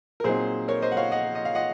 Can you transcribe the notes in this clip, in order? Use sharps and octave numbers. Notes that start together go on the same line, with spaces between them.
A#4
A#2 F#3 C4 D#4 G#4 C5
A#4 C#5
C5 D#5
F#5
C#5 F5
D#5 F#5
D#5
F5
D#5 F#5